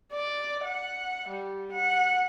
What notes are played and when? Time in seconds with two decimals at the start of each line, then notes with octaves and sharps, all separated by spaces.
0.13 D5
0.64 F#5
1.29 G3
1.72 F#5